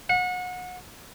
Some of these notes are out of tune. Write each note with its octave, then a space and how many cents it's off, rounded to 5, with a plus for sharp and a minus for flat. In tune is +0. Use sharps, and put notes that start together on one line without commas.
F#5 -30